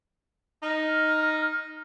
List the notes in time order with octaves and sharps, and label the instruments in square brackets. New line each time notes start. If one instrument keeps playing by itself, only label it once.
[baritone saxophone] D#4 [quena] F6